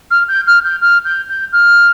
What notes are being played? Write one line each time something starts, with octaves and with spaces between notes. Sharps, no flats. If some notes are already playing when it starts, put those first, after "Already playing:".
F6
G6
F6
G6
F6
G6
G6
F6